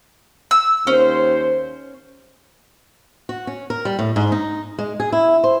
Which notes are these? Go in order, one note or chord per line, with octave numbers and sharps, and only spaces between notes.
E6
D#2 C#4 C5
F#4
C#4
A#4
G3
A2
G#2
D#4
G#3
G#4
E4
C5